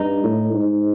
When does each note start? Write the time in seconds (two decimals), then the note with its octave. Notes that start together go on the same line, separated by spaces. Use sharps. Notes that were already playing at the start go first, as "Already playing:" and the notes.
Already playing: G2 D#4
0.24 A2
0.54 G#2